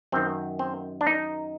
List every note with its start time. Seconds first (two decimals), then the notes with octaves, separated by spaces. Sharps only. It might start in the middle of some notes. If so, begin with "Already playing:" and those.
0.12 F#2 D#3 C4
0.59 C4
1.01 D4
1.07 D#4